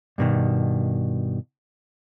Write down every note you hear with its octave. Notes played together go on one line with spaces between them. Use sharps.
G2 B2 D#3